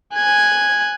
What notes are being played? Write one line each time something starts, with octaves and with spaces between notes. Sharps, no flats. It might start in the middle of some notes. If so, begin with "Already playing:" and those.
G#5 F#6 G#6